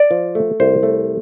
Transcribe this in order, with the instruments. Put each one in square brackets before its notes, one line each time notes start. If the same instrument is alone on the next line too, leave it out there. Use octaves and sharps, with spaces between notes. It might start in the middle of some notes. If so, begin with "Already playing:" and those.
Already playing: [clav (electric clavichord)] D5
F3
A3
C2 C5
A3